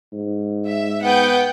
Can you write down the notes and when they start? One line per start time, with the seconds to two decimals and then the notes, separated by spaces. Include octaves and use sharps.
0.13 G#2
0.66 E5
1.03 B3 F#5 G5 G6